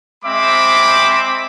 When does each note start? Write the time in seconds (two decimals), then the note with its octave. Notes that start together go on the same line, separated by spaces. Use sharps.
0.23 G#3 C4 C5 E5 B5 D6